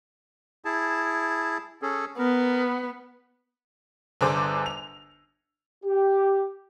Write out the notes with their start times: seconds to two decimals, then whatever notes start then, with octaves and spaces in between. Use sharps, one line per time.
0.65 E4 G#4 A5
1.82 C#4 G#4 A4
2.18 B3 A#4
4.21 G1 D3 G#4 C5 D6
4.66 F7
5.85 G4